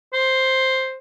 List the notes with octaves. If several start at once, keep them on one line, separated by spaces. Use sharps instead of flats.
C5